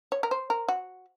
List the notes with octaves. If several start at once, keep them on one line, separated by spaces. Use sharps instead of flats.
C#5
A#4
C5
A#4
F#4